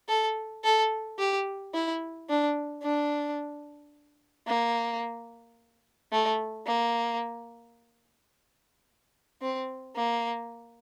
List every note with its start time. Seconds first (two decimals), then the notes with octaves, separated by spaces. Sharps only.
0.09 A4
0.64 A4
1.19 G4
1.73 E4
2.29 D4
2.83 D4
4.47 A#3
6.12 A3
6.66 A#3
9.41 C4
9.96 A#3